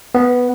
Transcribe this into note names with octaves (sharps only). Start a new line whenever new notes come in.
B3